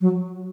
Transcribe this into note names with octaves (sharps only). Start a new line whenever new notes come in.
F#3